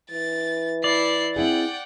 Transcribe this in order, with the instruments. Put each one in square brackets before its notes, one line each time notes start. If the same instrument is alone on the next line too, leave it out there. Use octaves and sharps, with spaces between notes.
[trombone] E3 [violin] A6
[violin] E4 C7 [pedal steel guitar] D5
[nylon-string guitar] C4 E4 G#4 [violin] F#5 G5